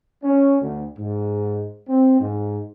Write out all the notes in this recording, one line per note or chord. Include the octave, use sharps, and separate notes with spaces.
C#4
D2
G#2
C4
G#2